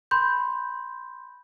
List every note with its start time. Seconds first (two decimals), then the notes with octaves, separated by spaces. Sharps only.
0.11 B5 C6 G6